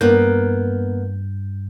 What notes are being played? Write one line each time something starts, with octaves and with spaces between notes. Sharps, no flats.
G2 A#3 B3 G6